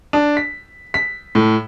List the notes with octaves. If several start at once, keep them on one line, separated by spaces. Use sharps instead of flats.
D4
B6
B6
A2